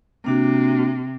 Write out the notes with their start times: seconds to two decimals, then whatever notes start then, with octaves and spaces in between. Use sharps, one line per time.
0.24 C3 A#3 D4 F#4